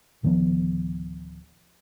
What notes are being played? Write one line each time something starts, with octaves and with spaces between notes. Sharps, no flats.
D1 D#3 F3 B3